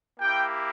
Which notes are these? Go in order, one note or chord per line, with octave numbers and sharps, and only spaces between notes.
A#3 E4 G4 G5